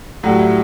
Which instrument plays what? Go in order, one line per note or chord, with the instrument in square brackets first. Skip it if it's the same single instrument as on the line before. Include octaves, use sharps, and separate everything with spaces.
[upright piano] A2 F#3 G3 F#4
E4